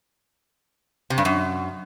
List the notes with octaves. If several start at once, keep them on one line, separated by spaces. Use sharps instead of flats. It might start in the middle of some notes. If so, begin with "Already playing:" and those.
C3
G2
F#2